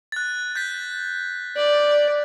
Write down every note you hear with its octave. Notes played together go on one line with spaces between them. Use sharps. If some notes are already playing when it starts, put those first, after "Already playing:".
F#6 A6
G6 A6 B6
D5